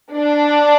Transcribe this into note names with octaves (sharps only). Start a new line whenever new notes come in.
D4